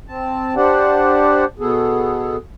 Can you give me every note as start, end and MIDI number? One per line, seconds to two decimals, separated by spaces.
0.08 0.55 60
0.08 0.55 81
0.56 1.44 62
0.56 1.44 67
0.56 1.44 72
0.56 1.44 74
0.56 1.44 78
1.60 2.36 47
1.60 2.36 59
1.60 2.36 68
1.60 2.36 69